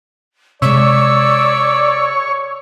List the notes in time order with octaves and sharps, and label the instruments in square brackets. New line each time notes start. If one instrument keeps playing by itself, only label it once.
[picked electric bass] C3 G#3 [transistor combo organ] C#5 [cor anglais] D5 [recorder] E6